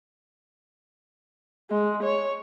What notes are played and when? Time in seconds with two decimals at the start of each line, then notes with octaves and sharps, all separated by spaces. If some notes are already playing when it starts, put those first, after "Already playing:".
1.70 G#3
2.03 C#5